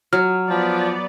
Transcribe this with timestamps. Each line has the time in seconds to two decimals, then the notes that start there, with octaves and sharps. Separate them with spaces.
0.13 F#3 F6
0.50 F3 B3 D5